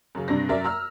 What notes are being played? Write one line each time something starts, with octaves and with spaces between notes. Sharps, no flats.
F#2 C#3
G2 C3 D4 A#6
F#2 A#4 D5 E5
A#5 E6 F6